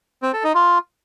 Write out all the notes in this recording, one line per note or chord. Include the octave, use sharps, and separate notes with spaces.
C4
A4
D#4
F4